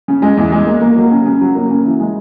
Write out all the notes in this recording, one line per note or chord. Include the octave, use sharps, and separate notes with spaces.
C#3
G#3
E2
G#3
A#3
A#3
F#3
C#3
C#3
F#3
A#3
C#3
E3
G#3